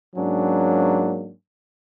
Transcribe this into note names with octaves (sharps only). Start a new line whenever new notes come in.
G#2 F#3 A#3 C#4 D4